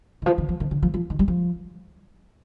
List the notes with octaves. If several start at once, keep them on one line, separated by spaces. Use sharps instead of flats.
D#3
F3
D#3
F3
D#3
D3
F3
F3
D#3
G3
F3